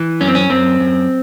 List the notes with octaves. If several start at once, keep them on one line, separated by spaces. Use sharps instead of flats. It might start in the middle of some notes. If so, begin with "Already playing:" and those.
Already playing: E3
F#2 C#4
C4
C#4
F#2 C4
F#2